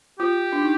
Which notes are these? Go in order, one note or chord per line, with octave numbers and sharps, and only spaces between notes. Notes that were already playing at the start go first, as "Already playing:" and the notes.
F4 G4
D4
D#4